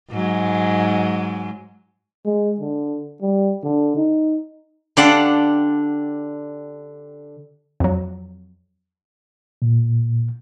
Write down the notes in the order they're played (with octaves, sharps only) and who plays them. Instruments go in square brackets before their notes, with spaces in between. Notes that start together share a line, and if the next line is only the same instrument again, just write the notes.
[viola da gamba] G#2 F#3 G#3
[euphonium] G#3
D3
G3
D3
D#4
[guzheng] D3 G4 D5 F5 F#5 A5
[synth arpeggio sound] F2 F#3
[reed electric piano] A#2